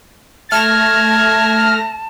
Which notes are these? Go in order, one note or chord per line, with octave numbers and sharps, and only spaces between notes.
A3 A5 F6 G#6 A#6